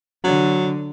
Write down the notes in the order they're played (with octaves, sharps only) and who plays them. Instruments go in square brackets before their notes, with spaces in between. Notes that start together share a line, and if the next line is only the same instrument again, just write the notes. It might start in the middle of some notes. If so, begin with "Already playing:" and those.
[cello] D3 [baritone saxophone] F#3